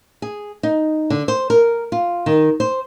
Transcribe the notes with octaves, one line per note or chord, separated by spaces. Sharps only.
G#4
D#4
D3
C5
A#4
F4
D#3
C5